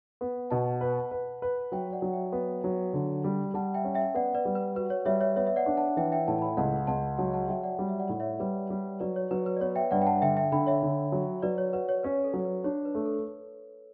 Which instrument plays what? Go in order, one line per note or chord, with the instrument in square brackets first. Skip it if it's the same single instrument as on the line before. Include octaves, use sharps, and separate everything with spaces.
[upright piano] B3
[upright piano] B2 [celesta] F#5 A5
[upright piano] B4
B4
B4
[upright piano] F#3 [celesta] E5 G5
[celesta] D5 F#5
[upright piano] F#3
[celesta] E5 G5
[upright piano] B3
F#3
D3
G3
[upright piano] G3 [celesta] F#5 A5
[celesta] E5 G5
[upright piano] C#4
[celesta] E5 G5
[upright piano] B3 [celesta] D5 F#5
[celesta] B4 D5
[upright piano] G3
[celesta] B4
[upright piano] F#4 [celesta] B4
[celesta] C#5
[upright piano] G3 [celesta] C#5 E5
[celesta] C#5 E5
[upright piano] B3 [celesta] C#5 E5
[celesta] E5
D5 F#5
[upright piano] D4
[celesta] F#5 A5
[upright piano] E3 [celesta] E5 G5
[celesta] E5 G5
[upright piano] A2 [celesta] F#5 A5
[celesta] A5
G5 B5
[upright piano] C#2 [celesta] F#5 A5
[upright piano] C#2 [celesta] F#5 A5
[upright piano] F#3 [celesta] F#5 A5
[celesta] F#5 A5
[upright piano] F#3 [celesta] E5 G5
[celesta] D5 F#5
[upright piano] G3
[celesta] E5
D5 F#5
[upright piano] A2
[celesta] C#5 E5
[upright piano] G3 [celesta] B4 D5
[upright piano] G3
[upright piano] F#3 [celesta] B4 D5
[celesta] C#5
[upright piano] F#3 [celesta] B4
[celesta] B4
D5
[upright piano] B3 [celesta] C#5
[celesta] E5 G5
[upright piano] G2 [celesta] D5 F#5
[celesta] G5
F#5 A5
[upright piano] D3 [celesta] E5 G5
[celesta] E5 G5
[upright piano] D3 [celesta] G5 B5
[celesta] C#5 E5
[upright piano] D3
F#3
[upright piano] F#3 [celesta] B4 D5
[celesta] C#5
[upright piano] F#4 [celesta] B4
[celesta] C#5
[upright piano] C#4 [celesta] B4
[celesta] A4
[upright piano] F#3
[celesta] B4
[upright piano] D4 [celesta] C#5
[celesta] B4
[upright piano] A3
[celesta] A4